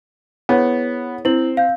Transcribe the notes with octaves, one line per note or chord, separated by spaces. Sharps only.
B3 E4 G#4 C#5
C4 E4 F#7
F5 G6